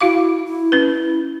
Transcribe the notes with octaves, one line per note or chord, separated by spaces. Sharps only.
E4 F#4 F5 D6
E4
C#4 B4